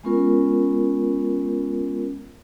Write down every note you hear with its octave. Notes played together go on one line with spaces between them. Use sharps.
G#3 B3 C#4 F4 A#4